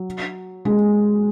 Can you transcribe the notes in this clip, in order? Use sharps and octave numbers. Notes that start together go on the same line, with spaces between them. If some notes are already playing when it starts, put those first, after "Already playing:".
Already playing: F#3
G#3